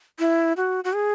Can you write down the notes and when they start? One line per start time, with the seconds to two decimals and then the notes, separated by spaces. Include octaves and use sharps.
0.19 E4
0.57 F#4
0.84 F#4
0.93 G#4